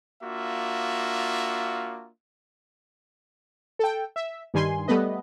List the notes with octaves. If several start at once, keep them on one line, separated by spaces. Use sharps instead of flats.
A#3 D4 F4 F#4 E5
A4 G5
E5
G2 D#3 G3 G#5 C6
G3 A3 B3 B4 D#5